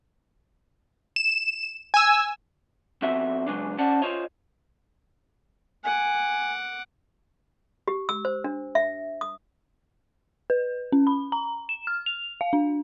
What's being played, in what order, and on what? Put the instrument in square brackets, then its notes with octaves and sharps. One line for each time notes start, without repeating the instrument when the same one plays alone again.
[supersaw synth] E7
G#5 E6
[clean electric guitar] F2 B3 C4 F#4 A4 E5
C#3 F#3 G#3 B3 D4
C#4 C5 D5 F#5 A5
F4 C5 C#5 D#5
[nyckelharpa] F#5 D6 [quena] G#5
[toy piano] G4
E6
C5
D4
E5
D#6
[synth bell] B4
C#4
B5
A#5
E7
F6
F7
F5
D4